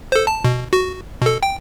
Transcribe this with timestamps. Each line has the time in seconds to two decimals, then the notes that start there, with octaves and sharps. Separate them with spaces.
0.12 A4 C5
0.27 A5
0.44 B2
0.73 F#4
1.22 B2 A4
1.43 G5